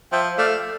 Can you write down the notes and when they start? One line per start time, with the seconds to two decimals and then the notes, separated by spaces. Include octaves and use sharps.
0.12 F3 E5 G5
0.38 A3 D5 F5